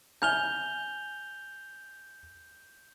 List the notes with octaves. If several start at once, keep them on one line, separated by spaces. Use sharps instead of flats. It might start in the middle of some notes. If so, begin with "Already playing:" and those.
G#5 F6 G6 F7 G7